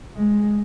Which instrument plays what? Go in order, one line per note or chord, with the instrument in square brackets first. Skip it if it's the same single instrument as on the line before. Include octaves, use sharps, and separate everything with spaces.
[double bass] G#3